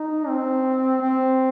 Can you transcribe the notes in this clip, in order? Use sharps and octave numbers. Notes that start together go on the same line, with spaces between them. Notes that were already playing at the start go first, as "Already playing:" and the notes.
Already playing: D#4
C4
C4